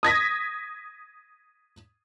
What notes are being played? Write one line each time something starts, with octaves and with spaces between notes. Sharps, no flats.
D#6 G#6 A#6 B6